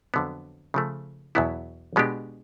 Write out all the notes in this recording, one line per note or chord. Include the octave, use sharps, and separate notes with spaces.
F2 D3 F#3 B3
C#3 F3 A3
E2 B2 F#3 B3 E4
B2 G#3 B3 D4 G4